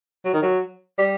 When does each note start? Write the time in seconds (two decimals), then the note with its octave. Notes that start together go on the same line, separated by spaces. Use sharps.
0.25 F#3
0.33 D#3
0.42 F#3
0.98 G3